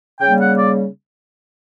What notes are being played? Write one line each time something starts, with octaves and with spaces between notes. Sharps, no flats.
C#3 G3 A#3 G5
F#5
D5